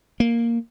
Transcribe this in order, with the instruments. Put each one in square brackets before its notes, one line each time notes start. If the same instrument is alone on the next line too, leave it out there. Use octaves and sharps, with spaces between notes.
[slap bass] A#3